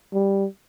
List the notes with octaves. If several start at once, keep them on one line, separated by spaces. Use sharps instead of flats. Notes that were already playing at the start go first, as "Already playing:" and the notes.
G3